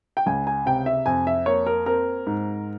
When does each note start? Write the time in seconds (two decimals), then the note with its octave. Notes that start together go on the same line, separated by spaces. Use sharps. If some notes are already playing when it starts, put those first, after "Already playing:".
0.17 G5
0.26 C#2 G#5
0.47 G#5
0.66 C3 G5
0.86 E5
1.06 F2 G#5
1.27 E5
1.46 A#3 C#5
1.66 A#4
1.86 C4 A#4
2.26 G#2